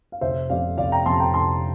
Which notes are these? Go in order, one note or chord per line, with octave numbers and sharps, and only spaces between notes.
F5
F1 C5 E5
F2 C3 D5 F5
F1 D5 F5
G5 A#5
F2 C3 A5 C6
G5 A#5
F1 A5 C6